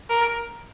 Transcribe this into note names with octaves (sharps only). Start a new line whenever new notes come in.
A#4